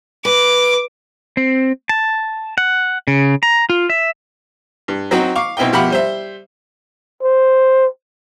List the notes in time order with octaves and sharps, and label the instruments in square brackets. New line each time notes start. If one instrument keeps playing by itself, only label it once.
[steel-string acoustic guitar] B4 [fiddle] D6
[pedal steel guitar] C4
A5
F#5
C#3
A#5
F4
E5
[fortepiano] G2
F#3 C4 D#4 F#4 D#5
F5 C#6 D6
B1 C4 E4 D#5 G5
B2 F3 G4 E5 F#5 B5
G3 C5 E5
[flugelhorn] C5